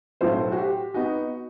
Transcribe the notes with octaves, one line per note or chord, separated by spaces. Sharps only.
B1 A2 F#3 C5
F#4
G4
B3 D#4 F#4